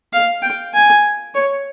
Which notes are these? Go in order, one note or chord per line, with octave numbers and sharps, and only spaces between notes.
F5
G5
G#5
C#5